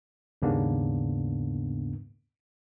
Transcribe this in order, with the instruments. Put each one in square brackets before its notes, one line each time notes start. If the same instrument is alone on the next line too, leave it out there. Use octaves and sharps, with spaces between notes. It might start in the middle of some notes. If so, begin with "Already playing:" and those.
[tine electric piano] D#2 G#2 C#3 A#3 B3 D4